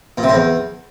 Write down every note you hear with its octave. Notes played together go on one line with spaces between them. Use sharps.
A#2
C3
A2
E2